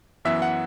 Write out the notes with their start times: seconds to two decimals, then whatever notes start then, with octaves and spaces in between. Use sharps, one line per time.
0.25 F#2 E3 B3 E5
0.42 F#5